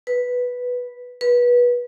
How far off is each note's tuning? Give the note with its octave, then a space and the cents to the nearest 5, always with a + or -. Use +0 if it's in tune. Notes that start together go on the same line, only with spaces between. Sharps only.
B4 -5
B4 -25